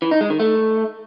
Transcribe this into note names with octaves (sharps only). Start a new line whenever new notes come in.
E3
D#4
G#3
D#3
A3